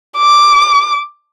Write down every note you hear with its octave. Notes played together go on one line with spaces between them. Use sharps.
D6